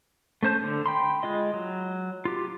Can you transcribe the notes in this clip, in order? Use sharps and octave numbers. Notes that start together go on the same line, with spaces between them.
A3 C#4 C5 A5 G6
D3
G5 B5 C6
G#3 F4 D#5
F#3
F4 G4